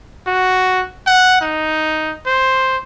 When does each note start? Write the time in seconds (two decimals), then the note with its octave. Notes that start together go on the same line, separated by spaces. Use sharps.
0.27 F#4
1.07 F#5
1.41 D#4
2.27 C5